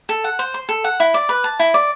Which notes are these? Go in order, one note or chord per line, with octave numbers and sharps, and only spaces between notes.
A4
F#5
C5
C6
A4
F#5
E4
D5
B4
A5
E4
D5